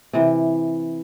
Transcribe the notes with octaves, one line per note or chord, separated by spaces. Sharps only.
C3 E3